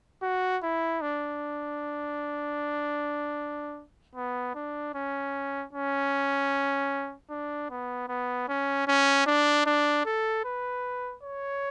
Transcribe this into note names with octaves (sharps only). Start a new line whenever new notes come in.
F#4
E4
D4
B3
D4
C#4
C#4
D4
B3
B3
C#4
C#4
D4
D4
A4
B4
C#5